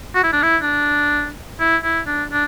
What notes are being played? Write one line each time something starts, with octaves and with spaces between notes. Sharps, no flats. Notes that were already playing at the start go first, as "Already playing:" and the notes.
F#4
E4
D4
E4
D4
E4
E4
D4
D4